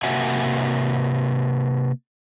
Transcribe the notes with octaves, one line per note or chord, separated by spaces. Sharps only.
C3 A#3 F#4 E5 F#5 G#5